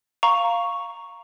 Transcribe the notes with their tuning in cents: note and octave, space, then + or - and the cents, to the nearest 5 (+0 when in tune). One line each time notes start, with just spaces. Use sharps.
F5 +0 A#5 +0 C#6 +0